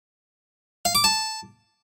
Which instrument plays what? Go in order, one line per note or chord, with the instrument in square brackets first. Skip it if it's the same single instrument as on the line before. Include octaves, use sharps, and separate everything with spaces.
[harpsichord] F5
D6
A5